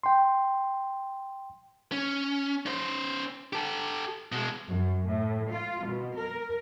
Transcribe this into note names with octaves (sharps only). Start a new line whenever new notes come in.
G5 C6
C#4
C#4 C5
G4 A4
B2 G#3
F#2
A2
F4
B2
A#4